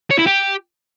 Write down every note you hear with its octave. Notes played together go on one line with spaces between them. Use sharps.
C#5
E4
G4